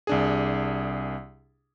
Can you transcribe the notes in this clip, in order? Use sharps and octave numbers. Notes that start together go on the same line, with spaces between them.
C2 D4 G#4